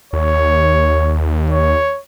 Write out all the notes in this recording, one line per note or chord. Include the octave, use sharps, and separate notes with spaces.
D#2 C#5
C#5